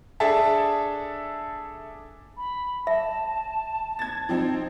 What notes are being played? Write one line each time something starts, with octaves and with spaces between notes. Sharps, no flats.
D4 G#4 A4 E5 A5
B5
E5 A5
G#6 A6
F3 C4 D#4